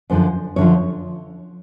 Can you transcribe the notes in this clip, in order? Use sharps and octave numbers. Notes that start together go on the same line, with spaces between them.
F#2 D3 F3 C5
F#2 D3 F3 C#5